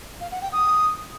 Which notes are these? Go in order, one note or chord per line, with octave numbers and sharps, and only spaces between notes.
F5
F#5
G5
D#6